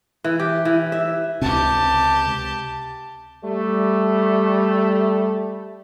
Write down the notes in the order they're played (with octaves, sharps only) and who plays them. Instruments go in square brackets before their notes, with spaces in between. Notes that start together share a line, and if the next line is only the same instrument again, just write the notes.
[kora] E3
G4
E3
E5
[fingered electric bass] C#2 C3 [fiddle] G4 A5
[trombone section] G3 A3